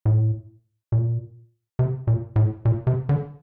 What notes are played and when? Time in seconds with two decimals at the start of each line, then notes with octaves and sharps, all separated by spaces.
0.05 A2
0.92 A#2
1.79 C3
2.07 A#2
2.36 A2
2.65 A#2
2.87 C3
3.09 D3